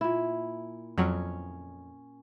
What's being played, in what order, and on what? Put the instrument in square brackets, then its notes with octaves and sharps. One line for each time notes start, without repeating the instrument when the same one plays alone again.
[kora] A#2 E4
[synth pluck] F2 F#3 [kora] C#4